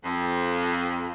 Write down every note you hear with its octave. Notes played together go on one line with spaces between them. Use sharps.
F2